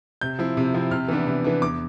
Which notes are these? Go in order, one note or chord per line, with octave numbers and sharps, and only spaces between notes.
C3 G6
F3 C4 E4
C3
F3 C4 E4
C3 F6
E3 B3 D4
C3
E3 B3 D4
E2 D6